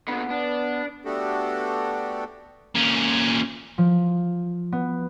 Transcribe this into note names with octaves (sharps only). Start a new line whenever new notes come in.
A#2 D3 B3
D4
A3 B3 D4 F#4 G4 A4
A#2 C#4
F3
B3